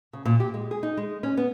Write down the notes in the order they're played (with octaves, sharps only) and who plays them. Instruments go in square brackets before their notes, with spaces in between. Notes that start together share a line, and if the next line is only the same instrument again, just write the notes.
[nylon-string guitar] C#3
A#2
G4
G#3
G#4
D#4
G#3
C#4
B3